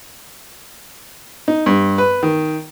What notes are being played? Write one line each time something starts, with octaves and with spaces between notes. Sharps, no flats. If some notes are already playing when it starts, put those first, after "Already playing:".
D#4
G2
B4
D#3